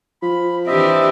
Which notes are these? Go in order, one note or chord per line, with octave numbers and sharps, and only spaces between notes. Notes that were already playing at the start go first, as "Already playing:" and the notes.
F3 B5
E3 C4 D4 G4 D#5 E5